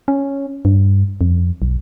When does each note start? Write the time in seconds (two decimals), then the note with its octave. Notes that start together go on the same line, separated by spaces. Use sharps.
0.08 C#4
0.65 G2
1.21 F2
1.62 B1